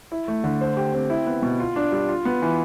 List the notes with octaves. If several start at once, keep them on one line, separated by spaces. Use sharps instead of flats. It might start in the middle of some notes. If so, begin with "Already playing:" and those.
E4
A3
D3
C5
G4
C4
E4
B3
B2
F4
D4
G3
F4
B3
E3